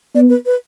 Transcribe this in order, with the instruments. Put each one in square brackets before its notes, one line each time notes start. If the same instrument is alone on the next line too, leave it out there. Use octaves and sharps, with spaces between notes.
[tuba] B3 [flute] D5
[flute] B4
B4